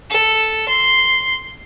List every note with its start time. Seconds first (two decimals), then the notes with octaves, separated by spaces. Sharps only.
0.10 A4
0.69 C6